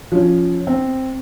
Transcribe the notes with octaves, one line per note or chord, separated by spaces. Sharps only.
F3 C#4
C4